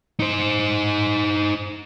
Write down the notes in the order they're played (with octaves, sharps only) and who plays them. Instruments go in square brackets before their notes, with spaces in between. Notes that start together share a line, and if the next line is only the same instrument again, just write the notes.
[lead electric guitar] D#4 C5